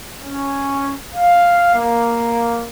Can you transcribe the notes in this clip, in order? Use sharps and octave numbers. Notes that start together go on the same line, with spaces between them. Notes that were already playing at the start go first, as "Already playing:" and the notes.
C#4
F5
A#3